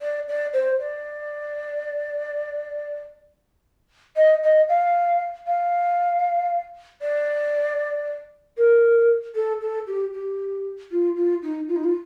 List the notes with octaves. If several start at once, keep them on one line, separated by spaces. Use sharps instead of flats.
D5
D5
C5
D5
D#5
D#5
F5
F5
D5
A#4
A4
A4
G4
G4
F4
F4
D#4
F4
D#4
F4